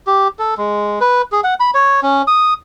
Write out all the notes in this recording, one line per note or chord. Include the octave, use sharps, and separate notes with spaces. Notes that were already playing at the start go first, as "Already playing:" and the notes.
G4
A4
G#3
B4
G#4
F#5
B5
C#5
C#4
D#6